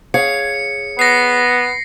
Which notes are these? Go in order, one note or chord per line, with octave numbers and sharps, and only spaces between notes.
G#4 C#5 F5 C#7
B3 A#6 C7